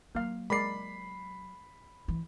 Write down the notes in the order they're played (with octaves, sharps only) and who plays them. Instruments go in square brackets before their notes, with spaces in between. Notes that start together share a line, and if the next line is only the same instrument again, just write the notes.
[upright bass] F#3 [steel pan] A#3 F5
[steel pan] G#3 A#4 D5 [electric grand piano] B5 C7
[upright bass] E3